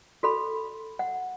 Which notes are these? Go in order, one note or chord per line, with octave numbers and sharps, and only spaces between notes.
F#4 A4 B5
F#5